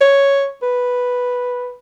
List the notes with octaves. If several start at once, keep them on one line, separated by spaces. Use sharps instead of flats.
C#5
B4